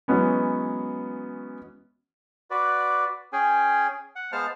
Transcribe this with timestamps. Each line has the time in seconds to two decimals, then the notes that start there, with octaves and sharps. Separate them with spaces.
0.08 E3 F#3 G#3 B3 C#4
2.51 F#4 B4 D5
3.33 C#4 G#4 G5 G#5
4.16 F#5
4.32 G#3 B3 C5 F5 A5 F6